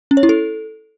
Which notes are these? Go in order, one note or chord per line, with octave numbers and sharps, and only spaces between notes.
C#4
C#5
E4
A4